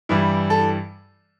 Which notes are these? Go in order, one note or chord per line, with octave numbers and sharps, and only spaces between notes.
G2 E3 G3 E4
A4